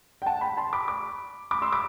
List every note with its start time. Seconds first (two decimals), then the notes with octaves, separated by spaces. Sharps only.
0.22 G5
0.26 F#5 A5
0.41 G5 B5
0.57 A5 C6
0.73 B5 D6
0.88 B5 D6
1.51 B5 D6
1.62 C6 E6
1.72 B5 D6